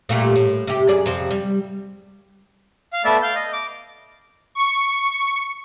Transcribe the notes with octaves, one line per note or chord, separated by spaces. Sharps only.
A#2 A3 G4
A2
C3 G4
F#2 G#4 D5
F2 C3
G3
F5
A3 B3 D5 E5
F5 G6
D#5
D6
C#6